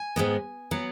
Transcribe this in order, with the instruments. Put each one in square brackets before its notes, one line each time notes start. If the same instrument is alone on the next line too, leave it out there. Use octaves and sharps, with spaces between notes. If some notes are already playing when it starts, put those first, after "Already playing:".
Already playing: [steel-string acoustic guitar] G#5
G#2 D#3 G#3 B3
F#3 B3